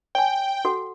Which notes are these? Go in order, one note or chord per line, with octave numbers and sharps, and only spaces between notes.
C#5 G5 G#5
F#4 A4 F#5